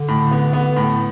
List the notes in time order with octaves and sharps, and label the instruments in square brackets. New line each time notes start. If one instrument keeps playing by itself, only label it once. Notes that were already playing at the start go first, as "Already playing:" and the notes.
Already playing: [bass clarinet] D3
[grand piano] A2
B3
B3
A2